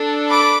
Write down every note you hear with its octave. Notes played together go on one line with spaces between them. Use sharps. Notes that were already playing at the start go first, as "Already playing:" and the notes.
Already playing: D4 A4
B5 D6